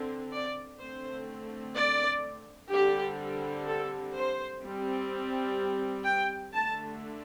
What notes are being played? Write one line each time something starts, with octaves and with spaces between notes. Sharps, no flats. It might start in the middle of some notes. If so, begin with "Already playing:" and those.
Already playing: D3 C4
D5
D3 A3 C4 C5
D5
D3 G3 C4 G4
A4
C5
G3 C4
G5
D3 A3 D4 A5